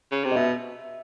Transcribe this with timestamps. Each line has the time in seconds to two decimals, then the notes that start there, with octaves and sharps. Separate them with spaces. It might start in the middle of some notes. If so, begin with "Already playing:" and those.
0.11 C#3
0.24 C3
0.31 D#5
0.36 B2 E5